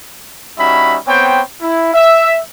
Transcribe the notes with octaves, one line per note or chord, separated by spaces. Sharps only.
G3 C#4 D#4 F#4 E5 B5
B3 C4 C5 C#5 G5
E4
E5